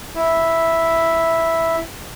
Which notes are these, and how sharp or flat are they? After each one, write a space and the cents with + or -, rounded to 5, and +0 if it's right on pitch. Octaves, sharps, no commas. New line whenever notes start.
E4 -5